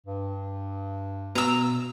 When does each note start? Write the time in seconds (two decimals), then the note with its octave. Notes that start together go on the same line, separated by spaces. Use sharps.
0.06 G2
1.35 B2 A#5 E6